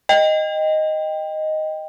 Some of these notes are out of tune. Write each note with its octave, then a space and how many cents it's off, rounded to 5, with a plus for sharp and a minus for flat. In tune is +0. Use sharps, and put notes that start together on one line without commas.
D#5 +0 G5 +10